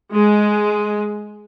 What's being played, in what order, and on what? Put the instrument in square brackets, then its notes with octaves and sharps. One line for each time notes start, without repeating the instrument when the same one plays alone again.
[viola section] G#3